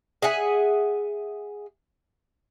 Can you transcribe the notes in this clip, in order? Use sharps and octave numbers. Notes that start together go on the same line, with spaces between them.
G#4 E5 F#5 G#5